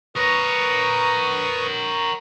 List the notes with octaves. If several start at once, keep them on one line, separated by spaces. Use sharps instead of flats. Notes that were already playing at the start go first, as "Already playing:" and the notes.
A#4 B4 C#5 C#6 D#6